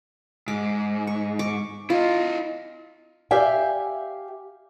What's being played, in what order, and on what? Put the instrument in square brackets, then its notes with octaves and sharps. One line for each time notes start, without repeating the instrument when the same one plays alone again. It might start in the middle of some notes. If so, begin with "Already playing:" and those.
[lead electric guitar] G#2 [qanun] D6
[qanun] C#6
C#6 D6
[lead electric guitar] E4 D#5 [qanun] F4
[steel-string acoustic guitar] G4 D5 E5 F5 G5 G#5